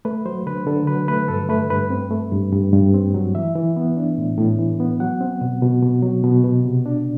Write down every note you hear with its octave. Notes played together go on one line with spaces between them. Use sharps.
A3 B4
F#3 C5
D3 B4
D3 A4
F#3 B4
A3 B4
G2 A4
A3 B4
G2 B4
C4
A3
G2
G2
G2
C4
F#3
E3 E5
E3
B3
D4
A2
A2
E3
B3
F#3 F#5
C4
B2
B2
B2
F#3
B2
B2
C3
D4